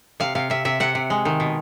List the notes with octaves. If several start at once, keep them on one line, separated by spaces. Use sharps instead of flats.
C3 F5
C3 F5
C3 E5
C3 E5
C3 F#5
C3
G#3
D#3
B2